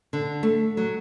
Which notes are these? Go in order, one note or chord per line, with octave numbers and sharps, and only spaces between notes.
D3
A3
F#3